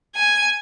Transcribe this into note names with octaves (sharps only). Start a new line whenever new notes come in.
G#5